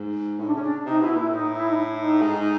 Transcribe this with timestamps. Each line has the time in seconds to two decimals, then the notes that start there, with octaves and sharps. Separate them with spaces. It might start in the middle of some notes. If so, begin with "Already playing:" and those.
Already playing: G#2
0.39 A2 D#4
0.46 D4
0.54 C#3 C#4
0.62 D4
0.85 C3 D#4
1.00 B2 E4
1.14 A#2 E4
1.30 A2 D#4
1.53 E4
1.69 D#4
1.76 E4
1.98 D#4
2.22 G#2